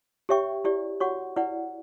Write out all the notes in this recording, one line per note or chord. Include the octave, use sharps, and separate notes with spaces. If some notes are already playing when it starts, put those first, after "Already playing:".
G4 C#5 E5 G5 C#6
E4 G4 D5
F#4 C#5 F#5 C#6
E4 B4 D5 F#5